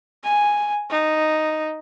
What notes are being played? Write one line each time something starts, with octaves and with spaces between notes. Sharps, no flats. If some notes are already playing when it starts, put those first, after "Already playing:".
G#5
D#4